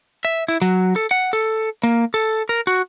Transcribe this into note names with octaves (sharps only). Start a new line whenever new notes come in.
E5
E4
F#3
A4
F#5
A4
A#3
A4
A#4
F#4